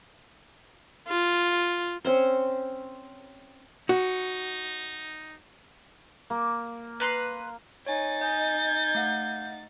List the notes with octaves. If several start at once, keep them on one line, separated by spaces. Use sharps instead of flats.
F4
C4 C#4 C5
D#4 F#4
A#3
B4 A#5 C6
D#4 C#5 G#5 A6
D#5 G#5 G6
A3 F5 F#5